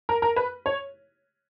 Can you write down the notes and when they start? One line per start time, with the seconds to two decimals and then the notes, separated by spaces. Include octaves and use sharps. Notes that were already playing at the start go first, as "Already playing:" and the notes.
0.09 A#4
0.22 A#4
0.36 B4
0.66 C#5